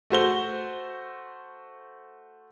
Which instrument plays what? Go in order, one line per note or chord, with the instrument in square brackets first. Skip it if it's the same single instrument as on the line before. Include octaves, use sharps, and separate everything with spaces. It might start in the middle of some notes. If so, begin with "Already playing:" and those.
[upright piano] A3 F#4 C5 G7